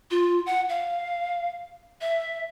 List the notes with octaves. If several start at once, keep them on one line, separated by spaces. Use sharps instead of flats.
F4
F#5
F5
E5